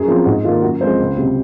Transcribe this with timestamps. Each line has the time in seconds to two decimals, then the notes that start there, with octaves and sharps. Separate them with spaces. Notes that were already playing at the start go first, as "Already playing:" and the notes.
Already playing: F#2 G#4
0.08 F3 C4
0.26 G#2 F#4
0.44 D#3 F4
0.49 A#3
0.62 F#2 F#4
0.81 F3 G#3 C4 C5
0.99 C#2
1.17 C3 F#3 C4